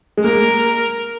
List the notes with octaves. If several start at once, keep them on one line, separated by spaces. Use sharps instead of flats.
G#3
A#3 A#4